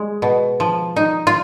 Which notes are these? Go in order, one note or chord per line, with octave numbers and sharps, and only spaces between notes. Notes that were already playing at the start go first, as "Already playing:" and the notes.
Already playing: G#3
B2
F3
D#4
F4